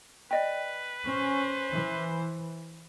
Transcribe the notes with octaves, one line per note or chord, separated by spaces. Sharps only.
B4 D5 D#5 G5
C#4 C5
E3